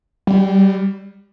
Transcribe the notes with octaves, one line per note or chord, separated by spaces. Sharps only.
G3